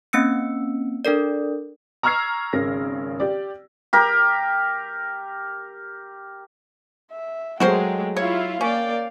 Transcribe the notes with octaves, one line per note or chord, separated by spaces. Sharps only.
A#3 C4 C#4 E6 C#7
D4 A4 A#4 D5
A#5 C#6 E6 F6 G#6 C7
G#1 C#3 A#4 A#6
G4 D5
G4 A#4
E5
F#3 G#3 A3 F#4 A#4 C5 G5
E4 F4 C#5 F5
A#3 C#4 D5 G5